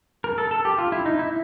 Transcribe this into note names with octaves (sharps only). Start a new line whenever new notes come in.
A#4
A4
A4
G4
F4
E4
D#4
E4